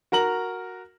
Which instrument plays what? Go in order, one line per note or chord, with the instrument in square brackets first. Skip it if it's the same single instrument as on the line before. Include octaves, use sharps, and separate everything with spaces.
[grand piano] F#4 A#4 A#5 F#7